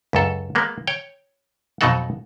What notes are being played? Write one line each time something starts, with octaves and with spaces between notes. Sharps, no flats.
C#2 F#2 A4
G#3 A#3 B3
C#5 G5
F2 B2 F#3 D#4 A4 F#5